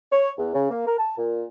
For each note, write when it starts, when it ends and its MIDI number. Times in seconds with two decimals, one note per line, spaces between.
0.11 0.31 73
0.38 0.53 40
0.54 0.68 49
0.70 0.84 58
0.86 0.95 70
0.99 1.14 81
1.17 1.44 46